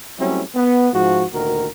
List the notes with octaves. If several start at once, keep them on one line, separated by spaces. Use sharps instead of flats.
F#3 G3 A3 C4 C#4 E4
B3
G#2 F3 F#4
D2 A#2 D#3 F#4 A#4